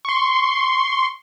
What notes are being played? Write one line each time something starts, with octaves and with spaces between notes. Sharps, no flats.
C6 C#6